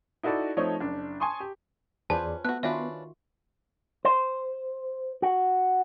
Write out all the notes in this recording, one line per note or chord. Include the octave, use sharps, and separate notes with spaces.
D#4 E4 F#4 A4 D5
F3 A3 C4 D#4 C#5
F#1 D4
G#5 A5 C6 C#6 D#6
G4
E2 C#4 F4 G#4 B4 C5 D5 A5
A3 B3 F#4 F#6
D#3 C#4 D4 F4 F#4 B4 E5
C5
F#4